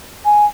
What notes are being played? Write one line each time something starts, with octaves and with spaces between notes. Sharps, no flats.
G#5